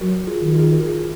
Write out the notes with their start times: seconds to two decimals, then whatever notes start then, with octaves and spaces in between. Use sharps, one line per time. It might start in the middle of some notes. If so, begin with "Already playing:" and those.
0.01 F#3 F#4 A#4
0.27 F4 G#4
0.40 D#3
0.54 F4 G#4
0.72 A#4
0.80 F4 G#4